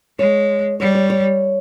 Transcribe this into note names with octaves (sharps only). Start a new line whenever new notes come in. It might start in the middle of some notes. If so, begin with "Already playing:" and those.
G#3 C#5
G3 C#5
C#5
C#5